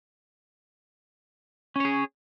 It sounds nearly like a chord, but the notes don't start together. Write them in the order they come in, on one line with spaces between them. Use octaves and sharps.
C#4 C#5 G#4